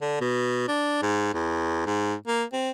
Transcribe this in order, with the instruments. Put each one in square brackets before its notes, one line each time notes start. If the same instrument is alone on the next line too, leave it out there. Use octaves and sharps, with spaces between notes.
[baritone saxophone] D3
B2
D4
G#2
E2
G#2
A#3
C4